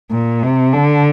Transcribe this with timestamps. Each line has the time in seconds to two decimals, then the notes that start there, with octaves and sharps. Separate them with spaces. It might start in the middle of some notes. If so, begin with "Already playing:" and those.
0.11 A#2
0.42 C3
0.73 D3